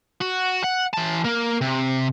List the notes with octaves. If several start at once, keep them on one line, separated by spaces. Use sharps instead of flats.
F#4
F#5
E3 A5
A#3 A#4
C3